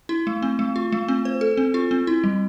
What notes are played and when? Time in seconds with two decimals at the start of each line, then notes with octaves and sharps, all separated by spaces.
0.09 E4
0.27 A3
0.42 C4
0.59 A3
0.76 F4
0.92 A3
1.08 C4
1.25 C5
1.41 A4
1.57 C4
1.74 F4
1.91 C4
2.07 E4
2.24 G3